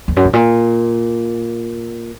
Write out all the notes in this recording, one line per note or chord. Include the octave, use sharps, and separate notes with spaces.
E2
F#2
G#2
A#2